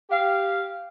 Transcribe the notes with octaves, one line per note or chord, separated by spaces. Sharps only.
G4 F5